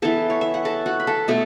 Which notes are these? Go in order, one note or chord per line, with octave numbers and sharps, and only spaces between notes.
E3 B3 A4 A5
C#5
E5
F#5
A4 A5
F#4 F#5
B5
A4 A5
B2 A3 A4